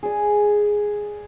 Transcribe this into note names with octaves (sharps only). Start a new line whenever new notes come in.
G#4 D5